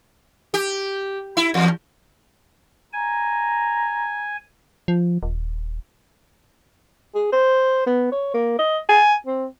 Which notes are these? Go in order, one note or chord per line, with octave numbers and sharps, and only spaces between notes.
G4
E4
E2
G#5 A#5
F3
D#1
G#4
C5
B3
C#5
A#3
D#5
G#5
C4